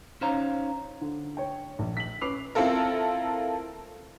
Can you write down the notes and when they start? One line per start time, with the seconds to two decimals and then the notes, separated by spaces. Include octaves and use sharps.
0.21 C#4 D#4 C5 C#5 F5 A#5
1.01 D3
1.37 C#5 G5
1.79 A#1
1.97 B6 F#7
2.21 C#4 B4 D6 C7 F7
2.55 C4 E4 F4 A4 A#4